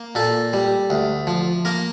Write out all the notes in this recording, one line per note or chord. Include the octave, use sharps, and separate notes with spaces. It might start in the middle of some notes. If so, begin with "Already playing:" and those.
Already playing: A#3
A#2 A4
G3
D2
F3
A#3 A#4